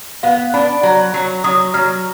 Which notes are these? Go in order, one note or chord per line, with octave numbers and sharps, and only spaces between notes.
B3 F5
D4 B5
F#3
F#3
F#3 D#6
F#3 F6